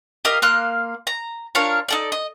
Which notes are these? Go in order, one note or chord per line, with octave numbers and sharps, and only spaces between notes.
G4 A#4 D#5 F5
A#3 F5 C6 F#6
A#5
D4 F4 A#4 C#5
D#4 A4 D5
D#5